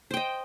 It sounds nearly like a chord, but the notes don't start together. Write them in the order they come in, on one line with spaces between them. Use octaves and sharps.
C5 G5 D#5